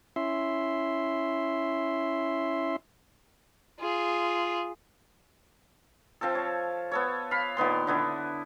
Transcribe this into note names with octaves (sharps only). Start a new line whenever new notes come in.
C#4 E4 E5 C6
F4 G#4
F3 C4 F4 A4
C#5
B3 A4 C#5
F5 B5
A#2 D#3 B3 C6
D3 B3 E4